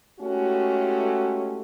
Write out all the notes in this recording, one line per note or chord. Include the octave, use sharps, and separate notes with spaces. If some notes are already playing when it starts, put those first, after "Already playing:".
G#3 A3 C#4 E4 F#4 G4